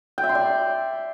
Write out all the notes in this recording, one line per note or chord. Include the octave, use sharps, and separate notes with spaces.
G5
E5
C6
D5